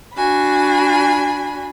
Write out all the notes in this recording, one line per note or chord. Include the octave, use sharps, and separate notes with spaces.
D4 F#4 G#5 B5